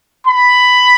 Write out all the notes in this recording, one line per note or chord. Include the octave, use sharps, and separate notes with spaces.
B5